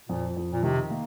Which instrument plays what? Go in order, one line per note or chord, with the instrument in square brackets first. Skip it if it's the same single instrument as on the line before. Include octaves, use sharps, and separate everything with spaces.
[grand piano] F2 [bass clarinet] A#2
[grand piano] F2
[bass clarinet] A#2
[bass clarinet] C3 [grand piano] D#3
[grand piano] A#3